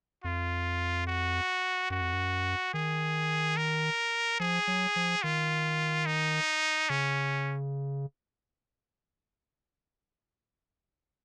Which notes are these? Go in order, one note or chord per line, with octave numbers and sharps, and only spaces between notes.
F2 F4
F#4
F#2 F#4
F2
F#2
D#3 G#4
A#4
F3 G#4
F#3
F3
D#3 F4
D#4
C#3 C#4